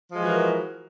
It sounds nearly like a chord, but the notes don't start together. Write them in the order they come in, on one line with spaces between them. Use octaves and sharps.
F3 G#3 E3 F#4 A#4